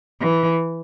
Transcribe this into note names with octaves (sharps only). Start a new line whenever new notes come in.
E3